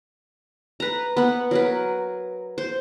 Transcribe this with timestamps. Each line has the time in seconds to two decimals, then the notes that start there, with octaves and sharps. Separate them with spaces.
0.80 B4 A#5
1.17 B3 F#5
1.51 F#3 A#4 B4
2.58 C5